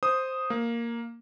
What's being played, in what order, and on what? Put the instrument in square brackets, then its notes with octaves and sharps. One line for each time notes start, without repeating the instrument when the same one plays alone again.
[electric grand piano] C5 D#6
A#3